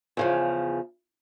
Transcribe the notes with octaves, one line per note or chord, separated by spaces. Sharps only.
E2 C#3 F3